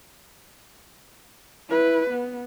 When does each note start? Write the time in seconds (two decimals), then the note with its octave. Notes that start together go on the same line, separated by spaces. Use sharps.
1.69 E4 B4
2.10 B3